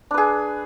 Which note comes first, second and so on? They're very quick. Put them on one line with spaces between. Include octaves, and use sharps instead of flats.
D4 B4 G#4